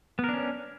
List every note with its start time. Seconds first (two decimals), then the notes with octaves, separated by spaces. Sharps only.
0.19 B3
0.24 A#4
0.29 D4
0.34 C#4